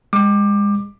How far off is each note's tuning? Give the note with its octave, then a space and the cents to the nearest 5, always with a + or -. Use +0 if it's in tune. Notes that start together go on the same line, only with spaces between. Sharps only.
G#3 -30 D6 +20